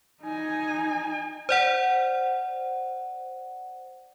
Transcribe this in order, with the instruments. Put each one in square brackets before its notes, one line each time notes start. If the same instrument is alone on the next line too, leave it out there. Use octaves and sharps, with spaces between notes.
[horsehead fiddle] D#4 G#5
[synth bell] C5 D5 F#5